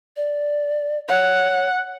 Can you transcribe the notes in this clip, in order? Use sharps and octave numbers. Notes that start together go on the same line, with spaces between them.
D5
C#5 F#5